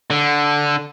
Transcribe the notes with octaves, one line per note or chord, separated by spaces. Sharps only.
D3